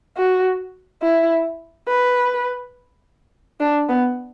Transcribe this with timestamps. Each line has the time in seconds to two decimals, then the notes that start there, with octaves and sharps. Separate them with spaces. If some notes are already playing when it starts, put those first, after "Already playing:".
0.17 F#4
1.02 E4
1.88 B4
3.61 D4
3.89 B3